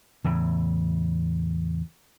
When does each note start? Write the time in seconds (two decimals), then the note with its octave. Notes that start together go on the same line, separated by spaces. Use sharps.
0.24 E2 A2 C#3